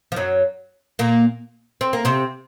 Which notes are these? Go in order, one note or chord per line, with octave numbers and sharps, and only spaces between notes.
F3
F#2 F#3
A#2 A#3
C4
A#3
C3 C4